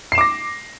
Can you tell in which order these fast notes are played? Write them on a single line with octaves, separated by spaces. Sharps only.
C7 E7 D6 A#6